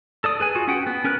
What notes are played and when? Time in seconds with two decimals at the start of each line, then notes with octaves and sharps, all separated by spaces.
0.24 A4 D5 D#6
0.40 G#4 B4 G#5
0.55 F4 F#4 G#4
0.68 C#4 F#5 G5
0.87 B3
1.04 C#4 A#4 B4 F#6